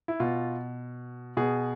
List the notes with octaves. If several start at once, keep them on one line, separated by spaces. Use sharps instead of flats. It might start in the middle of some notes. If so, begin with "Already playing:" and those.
E4
B2 F4
B2 G#4